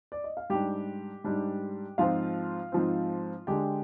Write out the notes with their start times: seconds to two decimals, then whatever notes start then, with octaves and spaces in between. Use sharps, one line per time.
0.12 D5
0.24 D#5
0.37 F5
0.50 G#2 G3 D4 G4 G5
1.24 G#2 G3 D4
1.98 G#2 F3 C4 F4 F5
2.72 G#2 F3 C4
3.47 D3 G#3 D4 G4 G5